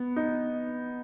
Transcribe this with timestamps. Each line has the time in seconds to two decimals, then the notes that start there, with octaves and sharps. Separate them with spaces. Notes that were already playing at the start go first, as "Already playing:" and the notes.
Already playing: B3
0.16 D#4